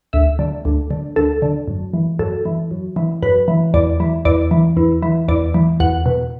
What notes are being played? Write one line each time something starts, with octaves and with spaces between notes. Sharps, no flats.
D2 E5
D3
D2
D3
D2 A4
D3
F#2
E3
F#2 A4
E3
F#2
E3
F#2 B4
E3
E2 D5
E3
E2 D5
E3
E2
E3
E2 D5
E3
E2 F#5
B2